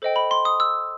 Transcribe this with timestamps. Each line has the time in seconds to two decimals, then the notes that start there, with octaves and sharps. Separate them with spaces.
0.02 A4 C5 D#5 G5
0.16 B5
0.31 C6
0.45 D#6
0.60 E6